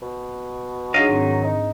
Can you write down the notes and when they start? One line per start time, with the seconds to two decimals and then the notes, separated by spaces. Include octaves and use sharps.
0.02 B2
0.94 F#3 D4 D#4 G#4 D#5 F5
1.07 G#2 D#3 C4
1.44 D#4